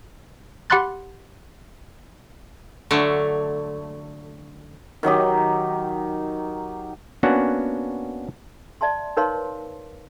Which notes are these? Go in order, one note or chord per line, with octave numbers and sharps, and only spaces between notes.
G4 F#5 B5 C6 F#6 A6
D3 F#3 A3
D#3 F#3 D#4 G4
A#3 B3 C#4 D4 F#4 F#5
D5 E5 A5 C6
D#4 A#4 B4 C#5 F5 C6